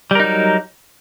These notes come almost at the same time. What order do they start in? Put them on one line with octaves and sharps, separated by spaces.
G3 A#4 D#4 F#3